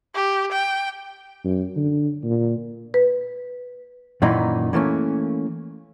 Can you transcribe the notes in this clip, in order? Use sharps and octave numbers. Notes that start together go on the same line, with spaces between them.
G4
G5
F#2
D3
A#2
B4
F#2 A#2 D#3 E3 D#4
E3 A3 A#3 C#4